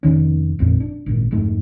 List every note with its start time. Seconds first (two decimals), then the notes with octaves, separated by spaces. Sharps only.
0.03 F1 C2 D#3 C#4
0.59 G#1 F2 A#2
0.80 D4
1.06 G#1 A#2
1.31 F1 G#2 A3